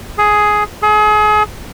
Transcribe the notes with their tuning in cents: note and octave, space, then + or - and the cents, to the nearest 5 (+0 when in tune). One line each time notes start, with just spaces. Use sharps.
G#4 +10
G#4 +35